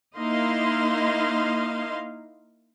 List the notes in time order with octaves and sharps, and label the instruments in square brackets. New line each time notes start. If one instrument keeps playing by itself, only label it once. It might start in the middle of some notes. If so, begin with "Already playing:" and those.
[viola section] A#3 D#4 E4 D#5 F5 C6